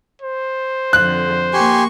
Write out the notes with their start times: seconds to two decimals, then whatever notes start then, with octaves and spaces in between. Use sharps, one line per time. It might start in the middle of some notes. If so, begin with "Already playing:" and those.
0.22 C5
0.93 F2 D3 F#6
1.54 A#3 G4 G#5 C6 C#6